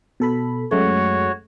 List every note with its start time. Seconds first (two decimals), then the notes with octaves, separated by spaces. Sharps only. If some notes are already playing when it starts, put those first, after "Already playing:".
0.20 B2 A4 B5
0.71 F#2 G#3 A3 F#4 C#5